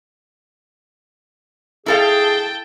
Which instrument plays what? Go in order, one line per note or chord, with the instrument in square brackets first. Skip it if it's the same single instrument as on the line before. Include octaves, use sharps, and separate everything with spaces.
[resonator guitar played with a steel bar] E4 A4 F5 [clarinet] G#4 [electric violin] G5 A5